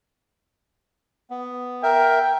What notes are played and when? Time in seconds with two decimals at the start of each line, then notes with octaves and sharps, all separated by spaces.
1.30 B3
1.83 A#4 E5 G5